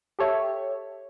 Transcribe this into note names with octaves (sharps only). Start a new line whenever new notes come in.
G4 A4 C#5 E5